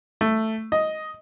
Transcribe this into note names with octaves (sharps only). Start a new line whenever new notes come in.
A3
D#5